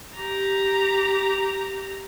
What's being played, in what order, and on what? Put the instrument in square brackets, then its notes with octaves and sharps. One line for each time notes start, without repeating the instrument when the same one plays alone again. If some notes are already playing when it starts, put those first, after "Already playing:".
[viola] G4 A#5